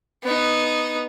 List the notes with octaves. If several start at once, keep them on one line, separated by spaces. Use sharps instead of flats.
B3 D#4